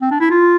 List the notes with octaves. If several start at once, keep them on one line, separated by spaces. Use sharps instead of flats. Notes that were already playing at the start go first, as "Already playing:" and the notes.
C4
D4
E4
F4